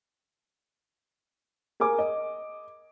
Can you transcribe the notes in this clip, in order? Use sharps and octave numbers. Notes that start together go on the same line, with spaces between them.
G#4 A#4 G#5 D6
D#5